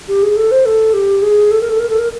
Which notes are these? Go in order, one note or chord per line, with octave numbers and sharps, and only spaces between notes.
G4
G#4
A4
C5
A4
G4
G#4
A4
A#4
A4
A#4
A4
A#4